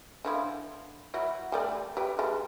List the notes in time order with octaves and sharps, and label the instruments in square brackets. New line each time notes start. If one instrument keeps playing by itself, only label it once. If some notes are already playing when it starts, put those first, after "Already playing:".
[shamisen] D3 F3 E4
F#3 E4 F#4
G3 A3 D5
G4 B4 G5
G#3 A4